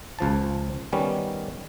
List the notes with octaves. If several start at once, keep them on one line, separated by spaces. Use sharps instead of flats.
C#2 F3 A5
D#3 G3 B3 C#4